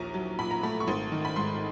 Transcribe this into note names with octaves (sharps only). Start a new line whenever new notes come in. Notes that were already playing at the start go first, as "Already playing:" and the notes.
Already playing: A#1 D#2 A#5
F#3
A#2 B5
A#5
A3 B5
C#6
G#1 C6
D#3
B5
G#2 C6